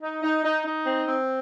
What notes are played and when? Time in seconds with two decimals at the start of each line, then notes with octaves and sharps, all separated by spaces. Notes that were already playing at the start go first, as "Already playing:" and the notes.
0.02 D#4
0.23 D#4
0.44 D#4
0.65 D#4
0.86 C4
1.07 C4